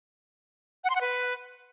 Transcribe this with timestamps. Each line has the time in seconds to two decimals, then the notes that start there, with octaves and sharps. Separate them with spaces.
0.84 F#5
0.90 C6
0.95 F#5
1.01 B4